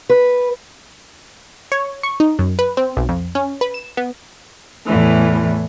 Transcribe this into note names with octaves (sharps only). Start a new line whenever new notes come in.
B4
C#5
C#6
D#4
F#2
B4
C4
B1
F2
C#4
B4
E7
B3
E2 A2 E3